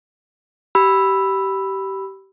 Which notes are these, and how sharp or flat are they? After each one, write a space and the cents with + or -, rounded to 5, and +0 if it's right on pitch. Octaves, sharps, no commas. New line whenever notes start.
G4 -25 B5 +0 E6 +5